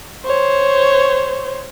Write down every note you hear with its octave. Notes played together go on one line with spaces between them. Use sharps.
C5 C#5